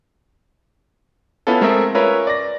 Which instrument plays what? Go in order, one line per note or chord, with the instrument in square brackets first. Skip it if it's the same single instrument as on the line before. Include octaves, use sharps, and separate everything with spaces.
[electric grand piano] B3 C#4 E4 F4 A4
G#3 A3 C4 A#4 E5
C#4 F4 A#4 B4 C#5 E5
D5 A#6